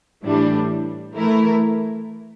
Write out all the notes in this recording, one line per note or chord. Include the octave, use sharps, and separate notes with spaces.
A2 E3 G3 D4
E3 A3 E4 A#4